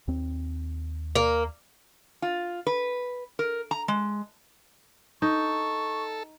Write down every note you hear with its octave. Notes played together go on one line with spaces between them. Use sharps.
D#2 C4
A#3
F4
B4
A#4
A#5
G#3
D#4 A4 C#6